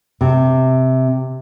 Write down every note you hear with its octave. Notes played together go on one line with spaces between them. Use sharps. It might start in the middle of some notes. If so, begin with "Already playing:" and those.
C3